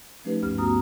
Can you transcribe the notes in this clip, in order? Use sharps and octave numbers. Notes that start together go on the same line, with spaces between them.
F3 A3 C#4 D#4 G4 B4
D2 G2 C#4 G4 F6
A3 B3 F#4 A#5 D#6 F6